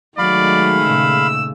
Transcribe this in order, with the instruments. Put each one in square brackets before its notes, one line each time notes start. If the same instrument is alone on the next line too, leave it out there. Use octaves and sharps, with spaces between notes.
[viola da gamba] D#3 G#3 A3 [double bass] F#3 [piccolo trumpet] D5 [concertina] F5 B5
[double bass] A#2 C#3 [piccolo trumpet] E6